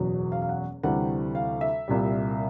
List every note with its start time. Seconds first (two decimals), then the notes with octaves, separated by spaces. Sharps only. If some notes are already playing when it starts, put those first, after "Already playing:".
Already playing: F#1 E2 B2 F#3
0.32 F5
0.42 F5
0.49 F#5
0.83 D2 C3 E3 G3 F#5
1.35 F5
1.61 E5
1.88 C2 A#2 G3